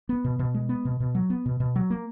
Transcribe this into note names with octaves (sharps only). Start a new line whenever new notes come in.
B3
B2
B2
G#3
B3
B2
B2
F#3
B3
B2
B2
F#3
A#3